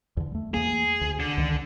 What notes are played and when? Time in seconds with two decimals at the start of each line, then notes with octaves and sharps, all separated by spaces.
0.17 E2 D3
0.31 G3 A3
0.54 E2 A3 A#3 G#4
1.01 D2
1.20 D3
1.37 C#2 D#3